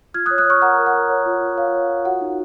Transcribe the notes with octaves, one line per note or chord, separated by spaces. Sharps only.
F4 F6 G#6
D#6 F#6
C#5
D#6 F#6
C#5 C#6 F6
A#4 F#5 A#5
A#4
F#5
A#4
C#5
F4
F4
C#5 F5
C#5
F4
F#4 F#5
D#4